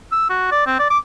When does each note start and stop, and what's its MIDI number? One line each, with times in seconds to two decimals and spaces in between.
0.12 0.28 88
0.29 0.48 66
0.52 0.66 74
0.67 0.78 60
0.79 0.87 74
0.90 0.98 86